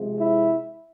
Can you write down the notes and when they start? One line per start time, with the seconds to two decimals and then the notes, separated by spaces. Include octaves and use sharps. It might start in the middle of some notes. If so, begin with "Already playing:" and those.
Already playing: C3 F3 G#3
0.17 E4